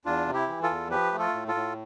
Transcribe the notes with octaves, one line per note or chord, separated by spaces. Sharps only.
E2 D4 F4
C3
E4 G4
E3
F4 A4
E2
F3 G4 B4
A3
F4 A4
A2
F4 A4
A2